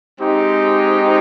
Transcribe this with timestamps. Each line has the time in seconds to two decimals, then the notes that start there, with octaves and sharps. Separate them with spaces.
0.19 G#3 C4 D#4 G4